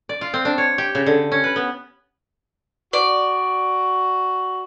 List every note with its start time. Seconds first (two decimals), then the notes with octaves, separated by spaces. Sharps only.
0.09 D5
0.21 F4
0.34 C4
0.45 D4
0.58 C#5
0.78 G4
0.95 C#3
1.06 D3
1.32 C#4
1.44 B4
1.56 B3
2.93 F#4 D5